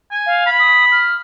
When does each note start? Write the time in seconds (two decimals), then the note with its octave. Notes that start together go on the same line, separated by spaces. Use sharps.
0.11 G#5
0.26 F5
0.46 B5
0.59 D#6
0.92 F6